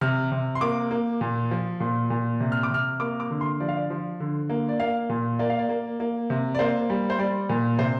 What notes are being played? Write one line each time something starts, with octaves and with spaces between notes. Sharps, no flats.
C3 F6
C3
C6
A#3 D6
A#3
A#2
F3
A#2
A#2
C3
F6
D6
C3 F6
A#3 D6
D6
D3
C6
F3 D5
F5
D5
F3
D3
A#3
D5
A#3 F5
A#2
A#3 D5
F5
D5
A#3
A#3
C3
D5
A#3 C5
G3
C5
G3 D5
A#2
C3 C5